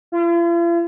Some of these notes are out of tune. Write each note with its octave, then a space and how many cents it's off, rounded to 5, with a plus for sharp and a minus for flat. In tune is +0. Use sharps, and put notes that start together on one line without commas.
F4 -45